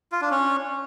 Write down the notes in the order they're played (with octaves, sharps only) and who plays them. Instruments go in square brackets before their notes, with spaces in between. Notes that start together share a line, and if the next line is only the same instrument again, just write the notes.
[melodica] F4
D4
C#4